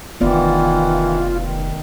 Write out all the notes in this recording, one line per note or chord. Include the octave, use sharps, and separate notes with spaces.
F1 D#3 E3 B3 E4 F4 D5
D#3